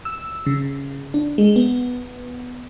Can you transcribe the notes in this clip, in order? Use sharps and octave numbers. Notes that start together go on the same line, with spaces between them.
E6
C#3
D4
G#3
B3